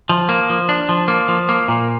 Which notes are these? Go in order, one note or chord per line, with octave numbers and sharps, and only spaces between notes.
F3
A#3
F3
D4
F3
A#3
F3
A#3
A#2